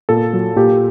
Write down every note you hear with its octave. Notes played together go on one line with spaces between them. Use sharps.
A#2 A4
F#3
A#2 G4